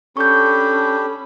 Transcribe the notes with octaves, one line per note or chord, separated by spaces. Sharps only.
C#4 D4 G4 A4 B5 C#6 G6